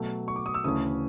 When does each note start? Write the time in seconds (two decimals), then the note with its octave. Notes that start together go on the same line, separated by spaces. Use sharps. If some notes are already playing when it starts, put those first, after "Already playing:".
Already playing: B2 F#3 A3
0.28 C#6
0.36 D6
0.46 D#6
0.54 E6
0.64 D2 C#3 E3 A3 C#4 D#6